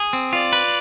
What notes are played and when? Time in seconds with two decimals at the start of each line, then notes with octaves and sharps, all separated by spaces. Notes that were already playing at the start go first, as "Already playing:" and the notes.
Already playing: G#4
0.13 C4
0.33 F4 D5
0.53 B4